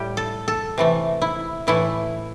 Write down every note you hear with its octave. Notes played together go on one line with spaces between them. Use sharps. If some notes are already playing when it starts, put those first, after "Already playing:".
Already playing: A2 G3 G4
A4
A4
C3 E3 A3
E4
A2 E3 A3 E4